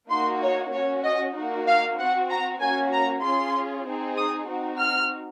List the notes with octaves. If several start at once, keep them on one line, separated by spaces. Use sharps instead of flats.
A#3 D#4 F#4 C6
C#5
C#4 F#4 C#5
D#5
A#3 D#4 F#4
F5
C4 F#4 F#5
A#5
A#3 C#4 F#4 G#5
A#5
C#4 F4 G#4 C6
C4 D#4 G#4
D#6
C4 D#4 F#4
F6